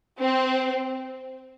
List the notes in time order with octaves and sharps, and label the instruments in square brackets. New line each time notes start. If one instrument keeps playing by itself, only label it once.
[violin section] C4